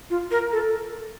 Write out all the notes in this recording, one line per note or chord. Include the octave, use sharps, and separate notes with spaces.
F4
A#4
A4